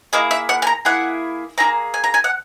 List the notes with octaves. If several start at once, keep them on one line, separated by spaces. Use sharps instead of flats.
A#3 E4 G#4 D#5
E5
F#5
G#5
A#5
A#3 E4 G#4 F#5
A#3 E4 G#4 A#5
G#5
A#5
G#5
F#5